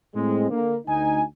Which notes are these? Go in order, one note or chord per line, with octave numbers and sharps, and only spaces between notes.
A2 G#3 C4
D3 A#3
D2 D#4 G#5